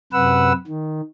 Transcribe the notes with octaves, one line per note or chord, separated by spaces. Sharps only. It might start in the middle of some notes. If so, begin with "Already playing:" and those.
F#2 C3 B4 F#5 E6
D#3